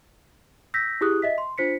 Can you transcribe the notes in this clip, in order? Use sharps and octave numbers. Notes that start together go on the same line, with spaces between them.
E6 G6 A#6 B6
E4 G4 G#4 D#6 F#6
D#5 E5 B6
C6
D4 F4 C5 B6 C#7